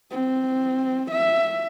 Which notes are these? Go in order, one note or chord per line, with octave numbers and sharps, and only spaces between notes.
C4
E5